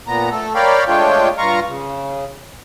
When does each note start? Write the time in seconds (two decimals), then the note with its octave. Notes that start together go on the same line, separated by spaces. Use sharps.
0.07 A#2 B3 A#5
0.31 A3 A4
0.55 A#4 C#5 D5 F5 G5 B5
0.88 G#3 A3 D4 F4 C#5 G5
1.38 G2 F4 F5 A#5 C#6
1.67 C#3